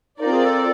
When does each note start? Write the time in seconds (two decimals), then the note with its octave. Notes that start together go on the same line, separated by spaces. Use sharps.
0.19 C4 D#4 F4 A#4 D5
0.32 G#4
0.45 A4